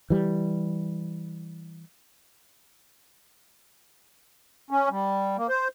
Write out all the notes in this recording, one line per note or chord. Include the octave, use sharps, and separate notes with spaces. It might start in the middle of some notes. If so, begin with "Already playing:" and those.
E3 G3
C#4
G3
A#3
C5